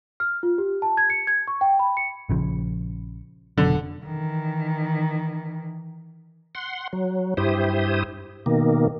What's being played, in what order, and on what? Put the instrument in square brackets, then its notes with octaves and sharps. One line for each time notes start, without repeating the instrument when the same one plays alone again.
[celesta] F6
F4
G4
A5
G#6
C#7
G#6
C#6
G5
B5
C#7
[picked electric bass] A#1 C#3 F3
[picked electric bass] F1 B2 F#3 [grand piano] D3
[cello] D#3 E3
[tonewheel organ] F#5 C6
F#3
G2 E4 G4 C5 D#6
B2 D#3 A#3